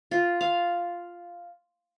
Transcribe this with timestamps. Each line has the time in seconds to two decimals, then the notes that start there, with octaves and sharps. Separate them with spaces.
0.11 F4
0.41 F5